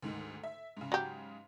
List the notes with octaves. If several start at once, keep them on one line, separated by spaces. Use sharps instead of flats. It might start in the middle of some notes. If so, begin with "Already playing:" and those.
D2 G#2 D#3
E5
G#2 C#3
F#3 G4